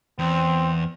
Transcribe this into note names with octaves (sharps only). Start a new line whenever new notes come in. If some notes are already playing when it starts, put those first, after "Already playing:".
E2 C4